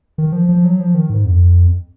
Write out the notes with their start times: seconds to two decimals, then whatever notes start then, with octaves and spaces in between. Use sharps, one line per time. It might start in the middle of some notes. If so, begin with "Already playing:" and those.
0.18 D#3
0.32 F3
0.49 F3
0.64 F#3
0.80 F3
0.94 D#3
1.10 G#2
1.25 F2